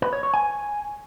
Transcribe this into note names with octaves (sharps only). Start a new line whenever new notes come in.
B4
C#5
C#5
G#5